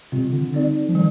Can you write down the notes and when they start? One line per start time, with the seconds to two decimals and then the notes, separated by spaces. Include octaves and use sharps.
0.12 C3 G3 C4 F4
0.32 D3
0.53 G3 C4 D#4 A4 D5
0.88 F3
0.95 D#3 G3